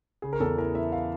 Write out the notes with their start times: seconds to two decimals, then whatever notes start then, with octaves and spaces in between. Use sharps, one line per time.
0.22 C#3 G#4
0.33 A#4
0.40 E2 A4
0.58 E3 A#4
0.75 E3 E5
0.92 F5